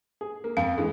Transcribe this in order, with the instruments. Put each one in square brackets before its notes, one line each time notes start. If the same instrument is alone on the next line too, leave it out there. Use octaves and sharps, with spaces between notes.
[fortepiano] G#4
A#3
[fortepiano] F2 [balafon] F5
[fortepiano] E3 G#3 A3